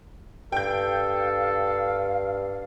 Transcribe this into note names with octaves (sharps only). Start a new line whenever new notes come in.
G2 A4 F5 G5 G6